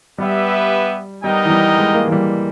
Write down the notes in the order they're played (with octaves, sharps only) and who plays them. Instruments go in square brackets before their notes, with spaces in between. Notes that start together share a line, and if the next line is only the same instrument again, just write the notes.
[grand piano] G3 [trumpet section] B3 G4 B4 E5
[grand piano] G3 [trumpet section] B3 D#4 A#4 D#5 G5
[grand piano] E3
G3
G#3
A#3
E3
G3